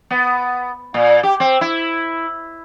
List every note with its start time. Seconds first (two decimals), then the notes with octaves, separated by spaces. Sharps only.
0.10 B3
0.94 A#2
1.23 G4
1.40 C4
1.61 E4